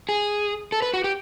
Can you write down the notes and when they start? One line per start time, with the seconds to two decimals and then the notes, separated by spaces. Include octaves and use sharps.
0.09 G#4
0.72 A4
0.82 B4
0.94 F#4
1.04 G4